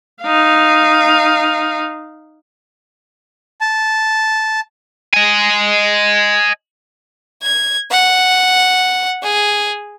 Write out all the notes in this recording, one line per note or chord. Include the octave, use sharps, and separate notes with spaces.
D#4 F5
A5
D#5 G#5
G#6
F#5
G#4